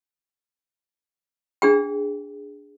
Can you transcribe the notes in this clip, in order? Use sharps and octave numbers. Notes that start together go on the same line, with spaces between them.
D4 G#4 G5